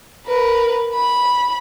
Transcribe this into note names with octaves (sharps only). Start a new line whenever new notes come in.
A#4 B4
B5